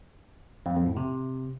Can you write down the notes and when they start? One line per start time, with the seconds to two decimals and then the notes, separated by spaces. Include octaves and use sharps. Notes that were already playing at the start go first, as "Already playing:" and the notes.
0.66 F2
0.76 F2
0.86 A2
0.97 C3